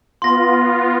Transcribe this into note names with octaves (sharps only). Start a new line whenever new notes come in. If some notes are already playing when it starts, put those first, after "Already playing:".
B3 F4 C6 A#6